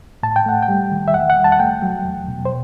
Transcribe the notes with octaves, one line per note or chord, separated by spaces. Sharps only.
A2 A5
G5
A3 F#5
G5
G3
D#3
E5
E2 F#5
F#5
G3
A5
F#5
A3 G5
F#3
E2
B2
C5